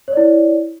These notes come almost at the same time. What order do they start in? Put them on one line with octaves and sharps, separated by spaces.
C#5 D5 E4